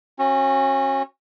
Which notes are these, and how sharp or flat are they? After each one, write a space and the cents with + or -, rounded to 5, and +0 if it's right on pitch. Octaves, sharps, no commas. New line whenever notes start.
C#4 -30 F#4 -10